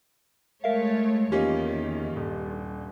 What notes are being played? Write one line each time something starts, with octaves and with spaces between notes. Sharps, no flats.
G#3 A3 A#4 C#5 E5 F5
E2 D#3 A#3 C#4 F4 G4 D#5
D#1 G2